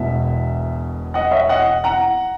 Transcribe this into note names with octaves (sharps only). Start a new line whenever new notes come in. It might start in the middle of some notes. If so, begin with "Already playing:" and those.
Already playing: E1 E2 B2 E5
D#5 F#5
C#5 E5
D#5 F#5
F#5 A#5